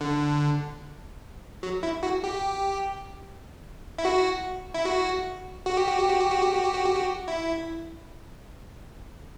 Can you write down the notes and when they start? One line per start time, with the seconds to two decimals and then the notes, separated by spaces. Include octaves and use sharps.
0.01 D3
1.63 F#3
1.83 E4
2.03 F#4
2.24 G4
3.98 E4
4.05 F#4
4.74 E4
4.85 F#4
5.66 F#4
5.77 G4
5.88 F#4
5.99 G4
6.10 F#4
6.21 G4
6.31 F#4
6.42 G4
6.53 F#4
6.64 G4
6.75 F#4
6.86 G4
6.96 F#4
7.28 E4